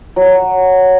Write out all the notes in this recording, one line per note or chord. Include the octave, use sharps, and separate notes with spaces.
F#3